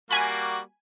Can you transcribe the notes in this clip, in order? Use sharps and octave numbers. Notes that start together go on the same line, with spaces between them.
G3 A#3 F#4 G#5 B5